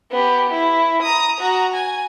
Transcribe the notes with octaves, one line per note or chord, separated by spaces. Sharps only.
B3 G4
E4
A#5 D#6
F#4 A#5
G#5